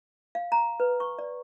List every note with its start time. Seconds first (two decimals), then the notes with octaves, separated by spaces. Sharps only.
0.35 F5
0.52 A#5
0.80 B4
1.00 C#6
1.19 D5